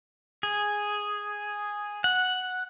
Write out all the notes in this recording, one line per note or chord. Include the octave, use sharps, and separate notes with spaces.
G#4
F#5